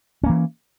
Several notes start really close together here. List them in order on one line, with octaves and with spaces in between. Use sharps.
C#4 A#3 E3